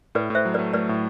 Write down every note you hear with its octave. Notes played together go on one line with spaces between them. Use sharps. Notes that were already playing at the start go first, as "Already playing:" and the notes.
A2 B4 D5
A2 C5 E5
F#3
B4 D5
A3
A3 B4 D5
A2